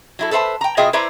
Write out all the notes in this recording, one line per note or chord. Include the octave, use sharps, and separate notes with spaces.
F#3 E4 A4
A4 B4 C5 E5 A5
G5 A#5
B2 F4 G#4 D#5 E5 G5
E4 B4 C5 D5 E5 A#5